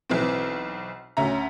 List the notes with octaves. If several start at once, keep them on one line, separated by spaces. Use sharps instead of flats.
B1 E3 C4
D2 C#4 E5 A#5